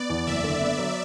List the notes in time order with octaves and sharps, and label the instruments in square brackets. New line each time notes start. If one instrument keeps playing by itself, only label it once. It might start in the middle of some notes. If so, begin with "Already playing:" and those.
Already playing: [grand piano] B3 [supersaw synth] D5
[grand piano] E2
[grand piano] F#1 [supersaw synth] E5
[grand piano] D3
B3
F#3